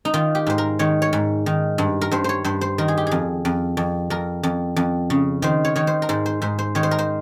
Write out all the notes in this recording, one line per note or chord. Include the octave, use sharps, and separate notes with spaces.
D#4
D#3 F4
G4
G#2 C5
A#4
D#3 C#5
C#5
G#2
D#3
G2
A#4
G2 C5
C5 C#5
G2 C5
C5
D#3 A#4
G#4
G4
F2 G#4
F2
F2
F2 A#4
F2
F2
C#3
D#3 C5
C#5
D#3 C#5
C5
A#4
G#2 C5
C5
G#2 C5
C5
D#3 C#5
C5
A#4
C5